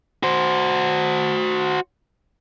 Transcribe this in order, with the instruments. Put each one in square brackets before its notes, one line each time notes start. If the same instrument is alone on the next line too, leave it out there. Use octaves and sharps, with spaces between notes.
[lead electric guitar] F#4 C5